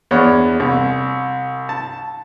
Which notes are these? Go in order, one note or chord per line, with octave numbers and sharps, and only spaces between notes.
E2 D4 C#5
C2
A5